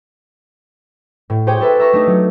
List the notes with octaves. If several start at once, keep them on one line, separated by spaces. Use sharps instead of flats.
A2
G4 G#4 C5 C#5 G5
G4 A4 B4 E5
E5 A#5 C#6 E6
A3 D4 D#4
F#3